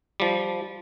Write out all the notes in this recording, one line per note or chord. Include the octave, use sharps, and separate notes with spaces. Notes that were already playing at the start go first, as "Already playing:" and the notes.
F3 G3